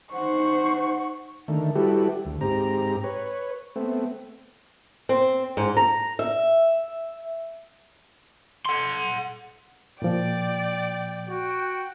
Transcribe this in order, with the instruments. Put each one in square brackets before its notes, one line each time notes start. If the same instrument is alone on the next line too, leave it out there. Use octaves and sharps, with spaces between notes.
[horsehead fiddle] D#4 C5 [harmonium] F#5 [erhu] C#6
[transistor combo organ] D3 D#3 A3
G3 E4 F#4 G4 A4 B4
D2
G#2 C4 G4 A#5
B4 C#5
A3 B3 C4
[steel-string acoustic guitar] C4
G#2
A#5
E5
[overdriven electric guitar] F#5 C6
[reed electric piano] A#2 F3 [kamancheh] D5 G5
[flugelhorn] F#4 [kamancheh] G5